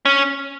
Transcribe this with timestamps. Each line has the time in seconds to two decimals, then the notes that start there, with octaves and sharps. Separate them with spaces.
0.05 C#4